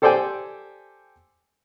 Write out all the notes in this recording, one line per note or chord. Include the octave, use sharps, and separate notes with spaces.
G4 A4 C5 D5 G5 G#5